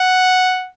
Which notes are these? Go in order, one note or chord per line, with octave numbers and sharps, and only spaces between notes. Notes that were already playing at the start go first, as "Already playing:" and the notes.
Already playing: F#5